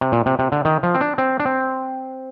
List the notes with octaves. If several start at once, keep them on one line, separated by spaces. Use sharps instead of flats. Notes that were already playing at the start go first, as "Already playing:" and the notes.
C3
A#2
C3
C3
D3
D#3
F3
C4
D4
C4
D4
C4